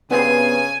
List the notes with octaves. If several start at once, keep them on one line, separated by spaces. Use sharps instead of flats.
G2 C#3 B3 C4 G#5 C7